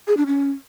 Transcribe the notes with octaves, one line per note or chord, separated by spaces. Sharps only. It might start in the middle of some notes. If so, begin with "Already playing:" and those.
G#4
D4
C#4